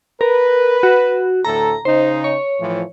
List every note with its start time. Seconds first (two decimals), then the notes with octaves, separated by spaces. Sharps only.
0.21 A#4 B4
0.83 F#4
1.45 D2 A2 A4 A#5
1.85 C#3 D#4 C5
2.24 C#5
2.60 A2 E3 F3